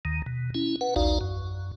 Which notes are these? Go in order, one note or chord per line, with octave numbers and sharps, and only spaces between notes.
D#2 D#3
B2
C#4 E4
B4 F#5
A#1 D#2 D#4 F#4 D5 F5
F#2